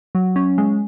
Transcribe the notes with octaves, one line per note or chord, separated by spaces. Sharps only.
F#3
C#4
G#3